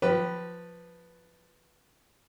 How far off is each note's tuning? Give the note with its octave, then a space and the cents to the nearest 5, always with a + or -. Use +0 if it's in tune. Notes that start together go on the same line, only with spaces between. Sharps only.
F3 +10 G4 -25 B4 +0